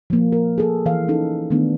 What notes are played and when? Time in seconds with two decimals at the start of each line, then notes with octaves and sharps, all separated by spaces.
0.10 F3 A#3
0.32 A#4
0.58 G#4 A4
0.86 E3 F5
1.08 C#4 D#4 A4
1.50 D#3 A3 B3 D4